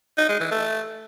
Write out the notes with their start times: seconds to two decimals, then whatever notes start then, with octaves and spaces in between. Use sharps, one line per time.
0.18 D#4
0.29 G#3
0.40 E3
0.52 A3